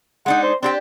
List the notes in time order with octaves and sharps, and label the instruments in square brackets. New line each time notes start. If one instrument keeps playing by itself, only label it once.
[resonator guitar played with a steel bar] G#3 D4 D#4 [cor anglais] F#5
[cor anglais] C5
[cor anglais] C4 [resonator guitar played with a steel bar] D4 G4 G5